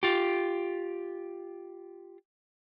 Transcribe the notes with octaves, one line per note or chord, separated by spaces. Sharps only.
F4 G4